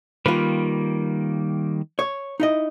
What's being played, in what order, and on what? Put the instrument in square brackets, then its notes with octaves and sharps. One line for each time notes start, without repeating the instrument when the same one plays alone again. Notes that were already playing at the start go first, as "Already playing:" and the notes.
[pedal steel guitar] D#3 G3 A#3 [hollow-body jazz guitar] F4 B4
[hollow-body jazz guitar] C#5
D#4 E4 D#5